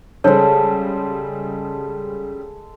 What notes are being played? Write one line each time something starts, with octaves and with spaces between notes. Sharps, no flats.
C#3 G3 G#3 A4 C5 C#5